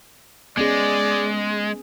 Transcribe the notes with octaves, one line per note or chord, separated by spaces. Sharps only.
G#3 B3 C#4 G#4 D5